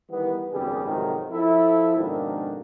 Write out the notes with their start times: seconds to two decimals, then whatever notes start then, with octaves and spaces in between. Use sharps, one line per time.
0.10 D#3 E3 G3 B3
0.52 G#1 F#2 C#3 G3 B3 G#4
0.85 F2 G#2 C3 D#3 F#3 G#3
1.31 F3 E4 A4
1.96 F2 G#2 B2 D#3 A#3 D4